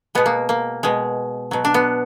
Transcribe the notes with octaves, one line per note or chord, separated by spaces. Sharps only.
B2 G#3 B3
A#3
A#3
B2 G#3
B2 F#3
D4
B3